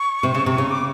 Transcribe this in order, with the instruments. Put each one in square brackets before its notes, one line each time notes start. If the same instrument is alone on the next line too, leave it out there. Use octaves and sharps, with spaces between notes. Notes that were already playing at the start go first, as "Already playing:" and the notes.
Already playing: [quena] C#6
[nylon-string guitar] C3
C#3
C3
C#3
[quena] D6